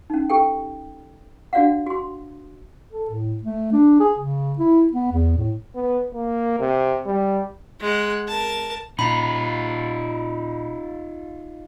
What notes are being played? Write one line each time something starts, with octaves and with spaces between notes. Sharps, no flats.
C#4 D#4
G4 A4 G5
D4 F#4 D5 F5 F#5
F#4 C6
A4
A2
A3
D4
G#4
C#3
E4
B3
E2
A2
B3
A#3
C3
G3
G#3 F#5
A#4 A5
A#2 D#4 F4 A#5 B5